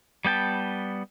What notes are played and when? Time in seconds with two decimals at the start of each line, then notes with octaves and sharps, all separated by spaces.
0.25 G3 B3 G5 A5